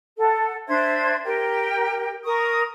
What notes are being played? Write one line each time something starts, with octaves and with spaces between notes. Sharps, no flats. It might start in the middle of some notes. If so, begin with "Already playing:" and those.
A4 F#5
D4 C5 E5 G#6
G4 A#4 G5
A#4 C#6 D#6